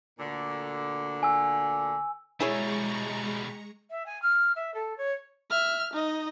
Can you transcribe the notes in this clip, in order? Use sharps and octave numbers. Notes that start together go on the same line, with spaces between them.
D2 A#2 D3
G#5 E6
B2 G3 G#3 E4 G#4 C#5 A#5 C#6
E5
G#5
F6
E5
A4
C#5
E5 F6
D#4 D#5